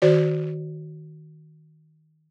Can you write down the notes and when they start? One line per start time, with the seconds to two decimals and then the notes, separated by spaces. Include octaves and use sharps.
0.02 D#3 F#4 C5 D5